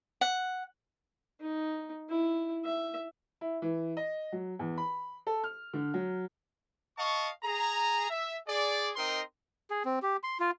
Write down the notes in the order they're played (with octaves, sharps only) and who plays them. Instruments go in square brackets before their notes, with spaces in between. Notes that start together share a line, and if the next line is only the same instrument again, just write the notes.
[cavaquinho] F#5
[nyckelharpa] D#4
E4
E5
[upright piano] E4
E3
D#5
F#3
E2
B5
A4
F6
D3
F#3
[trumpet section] D#5 F5 A5 C#6
G#4 A#5
E5
G#4 D5
C4 D#4 A#4 D#5 G5 C6
[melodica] G#4
C4
G4
C6
F4